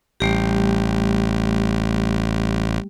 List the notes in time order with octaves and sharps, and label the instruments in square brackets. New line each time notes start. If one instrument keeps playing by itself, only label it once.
[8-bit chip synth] A1 [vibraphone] G3 A3 G4